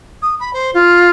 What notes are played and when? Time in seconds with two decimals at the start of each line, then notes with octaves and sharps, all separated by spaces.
0.22 D#6
0.40 B5
0.53 C5
0.74 F4